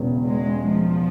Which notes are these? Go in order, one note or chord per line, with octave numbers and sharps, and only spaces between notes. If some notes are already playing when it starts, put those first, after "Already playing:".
Already playing: E1 E2 C#3
G#3
F3